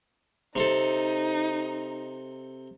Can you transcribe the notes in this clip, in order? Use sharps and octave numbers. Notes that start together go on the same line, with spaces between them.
C3 C4 D#4 A4